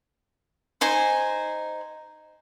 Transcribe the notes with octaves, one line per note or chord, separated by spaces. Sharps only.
D#4 C5 G#5